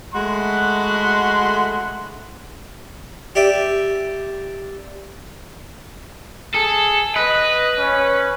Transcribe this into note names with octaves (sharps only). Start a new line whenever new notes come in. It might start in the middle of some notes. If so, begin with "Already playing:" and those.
G#3 A3 F#4 B5 C6
G4 D5 E5 G5
G#4 A4
B4 D#5
C#4